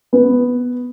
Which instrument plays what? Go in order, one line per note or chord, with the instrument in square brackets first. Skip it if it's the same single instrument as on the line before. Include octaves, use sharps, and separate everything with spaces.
[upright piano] B3